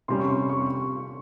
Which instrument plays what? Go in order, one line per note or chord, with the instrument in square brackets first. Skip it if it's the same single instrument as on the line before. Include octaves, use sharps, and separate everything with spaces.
[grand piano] C3 G3 C#4 [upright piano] C6
[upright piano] C#6
C6
C#6
C#6